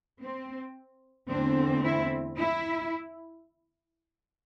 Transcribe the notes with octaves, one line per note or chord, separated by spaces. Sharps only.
C4
E2 D3 A3 C4 D4
E4
E4